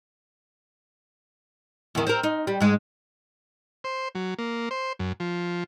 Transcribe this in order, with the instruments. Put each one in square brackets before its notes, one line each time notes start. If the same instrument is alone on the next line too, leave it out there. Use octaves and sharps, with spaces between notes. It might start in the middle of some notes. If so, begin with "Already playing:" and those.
[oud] E2 D#3
C4 A#4
D#4
G3
G#2 G#3
[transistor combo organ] C5
F#3
A#3
C5
F#2
F3